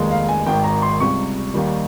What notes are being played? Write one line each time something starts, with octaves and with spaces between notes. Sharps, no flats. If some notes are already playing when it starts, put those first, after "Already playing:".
Already playing: F1 D#2 D#3 G#3
F5
G#5
G#1 G#2 D#3 G5
A#5
C6
C#2 C3 G3 C#6
D#2 D#3 G3